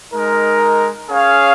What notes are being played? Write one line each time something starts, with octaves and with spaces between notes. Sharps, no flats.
G#3 D#4 A#4
C#4 G#4 C#5 F5